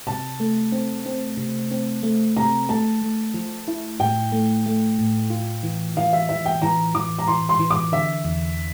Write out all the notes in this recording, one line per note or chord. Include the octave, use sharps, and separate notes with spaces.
C3 A5
A3
C4
C4
C3
C4
A3
C3 A#5
A3 A5
A3
F3
E4
A2 G5
A3
A3
A2
F4
E3
E3 F5
E5
E3 E5
G5
E3 A#5
E3 D6
A#5
E3 C6
C6
E3
D6
D3 E5
E2